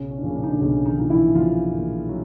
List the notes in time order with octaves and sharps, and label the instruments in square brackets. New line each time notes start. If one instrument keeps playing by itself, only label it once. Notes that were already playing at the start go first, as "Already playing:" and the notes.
Already playing: [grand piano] B1 C#3 C#4
C#4
D4
A#2 C#3 F3 C#4
D4
D#4
D3 D4
B1 C#3 C#4
D#3 D#4
A#2 F3 D#4
E3 E4
B1 F3 F4
A#2 F3
F#3